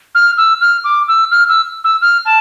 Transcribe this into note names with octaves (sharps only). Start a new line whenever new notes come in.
F6
E6
F6
D6
E6
F6
E6
E6
F6
A5